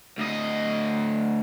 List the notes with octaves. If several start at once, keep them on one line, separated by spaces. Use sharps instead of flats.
D2 D#5